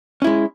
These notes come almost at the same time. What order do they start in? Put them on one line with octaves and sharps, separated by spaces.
C#4 E4 G#3